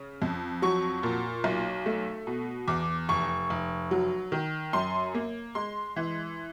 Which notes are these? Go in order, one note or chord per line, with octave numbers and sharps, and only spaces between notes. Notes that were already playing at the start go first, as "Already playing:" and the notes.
Already playing: C#3
F2
F#3 C#6
A#2
B1
A3
B2
E2 D6
F1 C#6
F1
F#3
D#3
F#2 C6
A#3
G#3 C6
E3